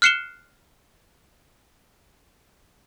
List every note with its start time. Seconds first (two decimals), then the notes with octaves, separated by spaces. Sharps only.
0.02 F6 F#6 C7 C#7 E7 G7